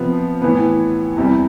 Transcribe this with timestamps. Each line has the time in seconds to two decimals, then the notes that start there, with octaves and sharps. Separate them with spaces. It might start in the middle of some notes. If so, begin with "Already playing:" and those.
Already playing: C3 F3 B3
0.42 A2 E3 B3
1.17 E2 C3 G3